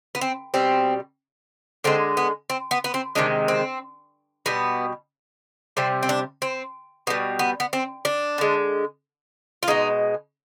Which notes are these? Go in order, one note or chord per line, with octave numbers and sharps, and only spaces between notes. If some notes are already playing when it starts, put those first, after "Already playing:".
B3
C4
B2 G3 C4
D3 G#3 C4
B3
C4
B3
B3
C4
C3 D#3 G#3 D4
C4
B2 G3 B3
C3 G3 C4
C4
D4
C4
B2 G3 B3
B3
B3
C4
D4
D3 G#3
F4
B2 G#3 D#4